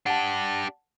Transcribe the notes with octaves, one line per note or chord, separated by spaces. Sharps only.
D4 G4 F#5 A5